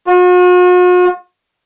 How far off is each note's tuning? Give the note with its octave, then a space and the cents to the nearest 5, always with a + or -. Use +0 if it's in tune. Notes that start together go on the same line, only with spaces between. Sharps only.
F#4 -45